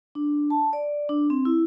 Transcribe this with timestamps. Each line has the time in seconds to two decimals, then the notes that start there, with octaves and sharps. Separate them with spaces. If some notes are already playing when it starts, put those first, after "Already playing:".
0.15 D4
0.50 A5
0.73 D5
1.09 D4
1.30 C4
1.45 E4